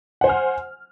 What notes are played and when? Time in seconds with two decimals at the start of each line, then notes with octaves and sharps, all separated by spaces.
0.21 F#5
0.24 C5
0.27 G#5
0.29 F6